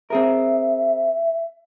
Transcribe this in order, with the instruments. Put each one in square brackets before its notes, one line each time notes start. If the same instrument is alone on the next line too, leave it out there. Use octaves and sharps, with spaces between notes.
[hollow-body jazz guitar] C4 G#4 A#4 [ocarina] E5